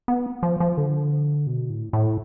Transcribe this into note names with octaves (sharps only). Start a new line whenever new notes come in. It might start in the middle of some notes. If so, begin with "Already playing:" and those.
B3
F3
F3
D3
B2
A2
A2